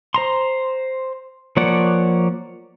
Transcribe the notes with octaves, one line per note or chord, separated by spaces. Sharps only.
C5 A#5 C6
F3 A#3 C#5 D5 F#5